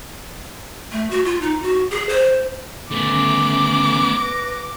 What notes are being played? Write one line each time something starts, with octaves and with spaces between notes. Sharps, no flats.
A3
F#4
F4
D#4
F#4
G#4
C5
D3 D#3 A3 B3 C#4 D6
B4 A#6